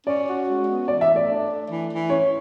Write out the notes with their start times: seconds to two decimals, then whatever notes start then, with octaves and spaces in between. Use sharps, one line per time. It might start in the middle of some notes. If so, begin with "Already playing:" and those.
0.06 C#4 D5
0.27 F#4
0.47 G#3
0.67 B3
0.88 E3 D5
1.01 E5
1.08 A3
1.16 D5
1.29 D4
1.50 A3
1.70 E3
1.90 E3
2.10 C#4 C#5